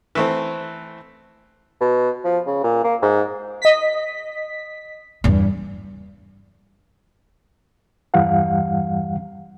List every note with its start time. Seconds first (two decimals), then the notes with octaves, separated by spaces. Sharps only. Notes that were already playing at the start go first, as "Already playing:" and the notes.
0.15 E3 A3 C4
1.81 B2
2.25 F3
2.47 C#3
2.64 A#2
2.84 A#3
3.02 G#2
3.62 D#5 B6
5.24 E2 G2
8.14 E2 G2 E3 G3 F5 F#5